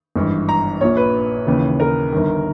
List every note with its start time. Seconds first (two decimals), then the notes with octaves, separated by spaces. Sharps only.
0.16 G#1 G2 E3
0.49 A#5
0.81 A#1 A#2 C#5
0.97 B4
1.46 D#2 C#3 E3
1.80 A#4
2.12 G1 G2 D#3